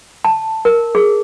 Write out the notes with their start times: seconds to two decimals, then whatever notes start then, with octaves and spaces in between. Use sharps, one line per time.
0.25 A5
0.65 A#4
0.95 G#4